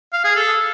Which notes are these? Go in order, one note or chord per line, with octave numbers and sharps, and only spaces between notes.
F5
G#4
A4